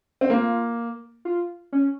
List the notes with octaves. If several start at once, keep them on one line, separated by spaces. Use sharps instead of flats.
C4
A#3 F4
F4
C#4